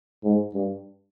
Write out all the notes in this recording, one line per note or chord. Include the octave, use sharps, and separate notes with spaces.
G#2
G2